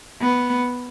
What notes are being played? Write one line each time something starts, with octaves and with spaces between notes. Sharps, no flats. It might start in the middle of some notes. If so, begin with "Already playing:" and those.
B3